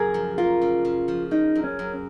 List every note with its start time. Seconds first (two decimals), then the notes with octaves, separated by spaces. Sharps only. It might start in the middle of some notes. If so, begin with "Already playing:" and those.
Already playing: F#2 C#3 A#3 G#4
0.14 F3
0.38 A#3 F4
0.62 C#3
0.85 C#3
1.08 F3
1.31 C#3 D#4
1.55 F#2
1.64 C#4
1.79 F#2